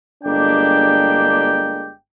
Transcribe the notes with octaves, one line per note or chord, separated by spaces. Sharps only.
G1 G#3 A#3 D4 G4 G5